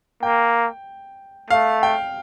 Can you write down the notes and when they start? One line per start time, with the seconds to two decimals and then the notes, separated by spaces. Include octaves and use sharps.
0.23 A#3 G5
1.50 A3 F5
1.83 G5